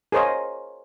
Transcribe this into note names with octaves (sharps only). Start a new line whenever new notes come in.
G#4 A#4 C5 C#5 D#5 F5